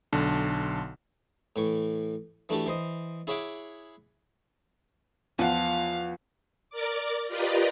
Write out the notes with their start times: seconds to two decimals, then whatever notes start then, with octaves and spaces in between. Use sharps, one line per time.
0.13 B1 D3 A5
1.56 A2 E3 C#6
2.49 E3 A3 D4 F#4 G4 A4
2.66 E3 C5 D#5
3.27 E4 G#4 C#5 E5 F#5 D6
5.39 E2 F3 F5 F#5
6.70 A#4 D5 D6
7.28 F4 G4 A#4 B4 D5 D#5